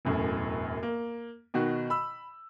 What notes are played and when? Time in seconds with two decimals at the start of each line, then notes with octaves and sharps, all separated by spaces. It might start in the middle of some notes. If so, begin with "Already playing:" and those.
0.05 E1 F#2 A2
0.83 A#3
1.54 B2 D#3 F#4
1.90 B5 E6